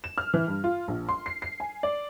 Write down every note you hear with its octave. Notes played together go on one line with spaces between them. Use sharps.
E7
F6
E3
G2
F4
A#1
C6
C7
C7
G#5
D5